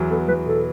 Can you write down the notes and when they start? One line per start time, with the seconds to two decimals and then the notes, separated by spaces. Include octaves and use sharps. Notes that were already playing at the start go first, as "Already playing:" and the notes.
Already playing: E2 F#3
0.11 B3 A4
0.28 E2 B4
0.46 B2 A4